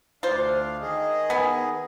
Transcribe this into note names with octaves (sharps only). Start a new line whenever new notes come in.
D2 D4 F4 C5 F5
D#3 G#4 D#5
B3 G#5